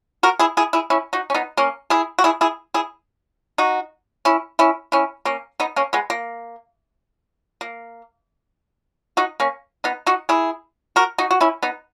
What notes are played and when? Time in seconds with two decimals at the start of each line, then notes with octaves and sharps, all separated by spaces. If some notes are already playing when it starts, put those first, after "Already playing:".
0.23 F#4 A#4
0.39 E4 G#4
0.57 E4 G#4
0.73 E4 G#4
0.90 C#4 E4
1.13 D#4 F#4
1.30 C#4
1.34 B3 D#4
1.57 A#3 C#4
1.90 E4 G#4
2.19 F#4
2.24 E4 G#4
2.41 E4 G#4
2.74 E4 G#4
3.58 D#4 F#4
4.25 C#4 E4
4.59 C#4 E4
4.92 C#4 E4
5.25 A#3 C#4
5.60 B3 D#4
5.76 A#3 C#4
5.93 G#3 B3
6.10 A#3
7.61 A#3
9.17 D#4 F#4
9.40 A#3 C#4
9.84 B3 D#4
10.07 D#4 F#4
10.29 E4 G#4
10.96 F#4 A#4
11.18 D#4 F#4
11.31 F#4
11.40 C#4 E4
11.63 B3 D#4